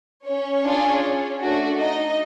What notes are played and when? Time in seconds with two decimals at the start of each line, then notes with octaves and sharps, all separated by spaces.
0.26 C#4 C#5
0.64 D4 F4 G#4
1.40 A3 D4 F#4
1.77 D#4 D#5